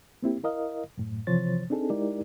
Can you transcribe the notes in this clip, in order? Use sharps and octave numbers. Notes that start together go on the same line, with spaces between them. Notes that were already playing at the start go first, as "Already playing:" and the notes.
A#3 C4 E4 G4
E4 A#4 D#5 F5
F#2 A2
C3 E3 F3 C5 C#5 A6
C4 D4 D#4 G#4 A4
G#3 D#4 E4 G4 A#4 D5